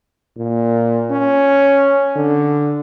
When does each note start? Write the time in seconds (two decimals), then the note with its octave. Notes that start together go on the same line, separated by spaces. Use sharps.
0.37 A#2
1.11 C#4
2.16 D3